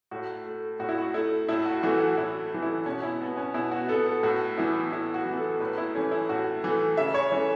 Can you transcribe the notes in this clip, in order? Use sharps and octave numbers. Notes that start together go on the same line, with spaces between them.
A2 F#4
A3
A2 F#4
E4
F#4
A3 E4
A2 E4
F#4
E3 A3 F#4
F#4
A2 E4
E3 A3
E4
B2 C#4
E4
B3 F#4
C#4
B2 E4
F#4
B3 A4
A4
A2 F#4
E3 B3 E4
A2 E4
F#4
E3
B3
A4
A2 B4
E4
E3 A3 C#4
E4
A2 F#4
E3 A3
C#3 E5
C#5
E3 A3 C#4